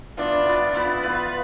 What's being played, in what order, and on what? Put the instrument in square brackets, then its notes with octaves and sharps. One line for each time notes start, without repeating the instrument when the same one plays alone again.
[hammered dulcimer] E3 B3 F4 [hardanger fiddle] D4
[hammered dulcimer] E3 B3 F4
[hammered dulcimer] E3 B3 F4 [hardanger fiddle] E4
[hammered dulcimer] E3 B3 F4 [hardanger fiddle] B4